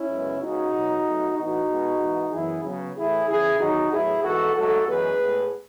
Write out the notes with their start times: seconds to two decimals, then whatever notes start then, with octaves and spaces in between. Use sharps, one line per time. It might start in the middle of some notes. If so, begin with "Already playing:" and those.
Already playing: C#4 E4
0.08 F#2 C#3 G#3 B3
0.40 C#3 G#3 B3 D#4 F#4
0.72 E2 B2 F#3
1.04 B2 F#3 A3
1.36 A2 E3 B3 D#4 F#4
1.68 B2 G#3 B3
2.00 G#2 E3 B3
2.31 F#2 E3 B3 E4 G#4
2.63 C#3 F#3 B3
2.96 A2 E3 A3 E4 G#4
3.27 E2 C#3 E3 E4 G#4
3.59 E2 D#3 F#3 D#4 F#4
3.91 A2 F#3 B3 E4 G#4
4.23 G#2 E3 B3 F#4 A4
4.55 G#2 F#3 A3 F#4 A4
4.87 F#2 E3 G#3 B3 G#4 B4
5.19 A2 G#3 B3